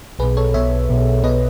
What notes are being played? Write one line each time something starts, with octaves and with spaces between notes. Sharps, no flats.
B1 B2 G#4 B4
A4 C#5
B1 B2 C#5 E5
B1 B2
B2 B4 D#5